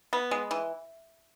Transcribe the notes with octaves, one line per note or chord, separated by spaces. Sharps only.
B3
G#3
E3